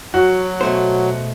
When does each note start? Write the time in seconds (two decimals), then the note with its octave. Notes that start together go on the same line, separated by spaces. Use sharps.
0.14 F#3 F#4
0.61 B2 A3 C5